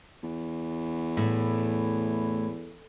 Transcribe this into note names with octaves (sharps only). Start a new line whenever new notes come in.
E2
A2